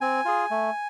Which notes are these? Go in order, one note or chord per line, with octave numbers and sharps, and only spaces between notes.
C4 G#5
F4 G#4
A3